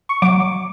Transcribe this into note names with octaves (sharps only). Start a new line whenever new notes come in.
C#6
F#3 D6